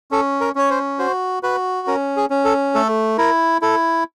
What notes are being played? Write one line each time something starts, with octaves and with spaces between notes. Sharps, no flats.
C#4 A4
A#4
C#4 C#5
C5
F#4 C5
F#4 B4
C#4 A#4
G#4
C#4
A4
A3 A4
E4 A#4
E4 A4